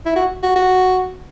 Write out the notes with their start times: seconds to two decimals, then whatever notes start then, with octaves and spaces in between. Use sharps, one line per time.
0.06 E4
0.16 F#4
0.43 F#4
0.56 F#4